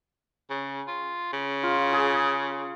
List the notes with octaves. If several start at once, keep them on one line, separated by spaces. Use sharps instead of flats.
C#3
F4
C#3
F4
G#4